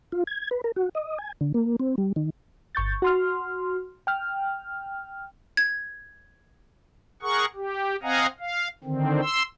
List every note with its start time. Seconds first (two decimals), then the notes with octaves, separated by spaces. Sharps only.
0.12 F4
0.27 G#6
0.51 B4
0.64 A#4
0.76 F#4
0.95 D#5
1.18 G#5
1.41 D3
1.54 A#3
1.80 C4
1.98 G3
2.16 D#3
2.75 G1 C#6 G6 A6
3.02 F#4 C6 F6
4.07 G5 F6
5.57 G#6
7.22 G#4 A#4 F#5 C#6
7.55 G4
8.03 C4 D#5 F5 F#5 G#5 A#5
8.40 F5
8.84 D3 D#3 C4
9.22 C6 E6